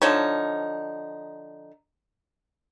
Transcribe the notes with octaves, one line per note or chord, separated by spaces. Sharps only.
D3 F3 D#4 C#5